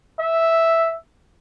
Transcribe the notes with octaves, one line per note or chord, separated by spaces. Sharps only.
E5